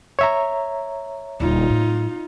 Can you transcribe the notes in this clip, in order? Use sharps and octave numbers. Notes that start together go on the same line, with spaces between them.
C#5 E5 A#5
D#1 D2 D#4 F4
A2 F#3